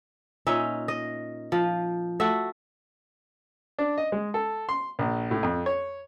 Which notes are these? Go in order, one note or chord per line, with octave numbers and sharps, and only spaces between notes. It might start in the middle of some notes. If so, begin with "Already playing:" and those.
A#2 C#4 D#4 E5
D#5
F3
A3 F#4 E5
D4
D#5
G#3
A4
C6
A#1
A2
F2
C#5